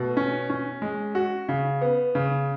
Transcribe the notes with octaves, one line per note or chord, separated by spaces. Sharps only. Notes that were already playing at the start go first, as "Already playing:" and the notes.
Already playing: B2 A3
C#4
C#4
G#3
F#4
C#3
B3
C#3